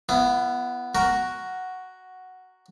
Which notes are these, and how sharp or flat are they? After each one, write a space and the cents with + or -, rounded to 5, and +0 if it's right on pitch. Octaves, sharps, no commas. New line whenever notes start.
B3 +0 E4 +40
F#4 +0 A#4 +0